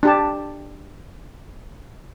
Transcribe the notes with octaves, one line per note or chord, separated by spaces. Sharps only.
D4 G4 A5